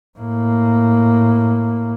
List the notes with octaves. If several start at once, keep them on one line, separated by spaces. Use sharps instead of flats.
A2 A#3